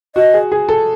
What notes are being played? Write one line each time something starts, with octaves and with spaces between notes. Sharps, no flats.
F#4 D#5
G#4
G#4
A4